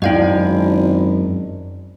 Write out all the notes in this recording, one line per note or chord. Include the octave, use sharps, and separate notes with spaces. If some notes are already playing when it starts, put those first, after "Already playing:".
G#1 F#2 E4 D5 D#5 F5 G5